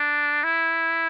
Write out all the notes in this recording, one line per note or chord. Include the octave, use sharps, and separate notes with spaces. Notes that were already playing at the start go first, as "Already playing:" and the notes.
Already playing: D4
E4